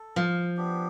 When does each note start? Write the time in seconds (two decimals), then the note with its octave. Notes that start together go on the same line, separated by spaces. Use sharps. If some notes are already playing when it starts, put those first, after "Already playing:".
Already playing: A4
0.16 F3
0.57 B3 D4 G4